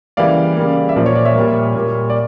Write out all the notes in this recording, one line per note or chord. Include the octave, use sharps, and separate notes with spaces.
C#3 E3 G3 A#3 D5 F5
C#3 G3 A#3
E5
A#2 F3 A#3 D5
C#5
D5
C#5 E5
A#2 G3 A#3
A#2 G3 A#3
D5